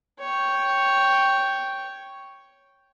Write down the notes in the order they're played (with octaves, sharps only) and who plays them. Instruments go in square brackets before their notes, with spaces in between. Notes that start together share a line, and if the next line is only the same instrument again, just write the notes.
[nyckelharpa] C#5 G5